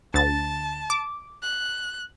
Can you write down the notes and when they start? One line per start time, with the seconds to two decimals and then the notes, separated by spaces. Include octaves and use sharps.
0.14 D2 A5 A6
0.90 D6
1.43 F#6